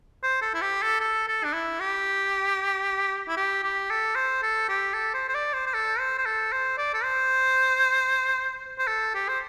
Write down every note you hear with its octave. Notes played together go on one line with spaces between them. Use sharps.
C5
A4
E4
G4
A4
A4
A4
D4
E4
G4
E4
G4
G4
A4
C5
A4
G4
A4
C5
C5
D5
C5
C5
A4
C5
C5
A4
C5
D5
A4
C5
C5
A4
G4
C5